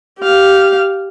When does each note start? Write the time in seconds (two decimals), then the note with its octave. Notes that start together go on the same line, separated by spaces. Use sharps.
0.20 G4 F5